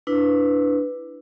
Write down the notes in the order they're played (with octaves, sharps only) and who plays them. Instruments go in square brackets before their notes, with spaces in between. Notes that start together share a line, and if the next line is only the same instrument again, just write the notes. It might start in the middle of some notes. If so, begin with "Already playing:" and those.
[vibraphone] D4 E4 B4